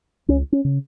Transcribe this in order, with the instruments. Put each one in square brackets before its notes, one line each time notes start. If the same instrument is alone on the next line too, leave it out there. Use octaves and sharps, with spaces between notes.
[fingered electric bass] C#2 C#4
C#4
C#3